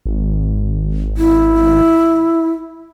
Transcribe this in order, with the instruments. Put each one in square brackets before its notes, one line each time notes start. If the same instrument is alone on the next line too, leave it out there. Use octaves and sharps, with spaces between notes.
[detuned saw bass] G#1
[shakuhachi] E4